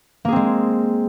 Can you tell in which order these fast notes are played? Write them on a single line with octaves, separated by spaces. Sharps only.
A#3 G#4 C4 G#3